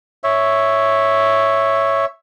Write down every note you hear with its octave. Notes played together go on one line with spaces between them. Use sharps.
C#5 E5